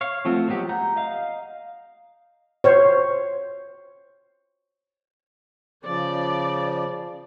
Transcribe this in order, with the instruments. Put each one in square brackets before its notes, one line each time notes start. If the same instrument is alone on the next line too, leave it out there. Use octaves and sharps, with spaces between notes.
[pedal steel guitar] C#5 F5
F3 A3 C4 F4 F#4
F#3 G#3 B3 G4
F#5 A#5 G6
D#5 F5
[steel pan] C5 C#5
[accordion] C#3 F3 [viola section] D5